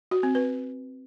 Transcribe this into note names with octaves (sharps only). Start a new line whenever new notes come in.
F#4
C4
B4